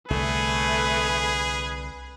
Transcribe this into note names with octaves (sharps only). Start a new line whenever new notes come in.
C2 D3 A3 G#4 B4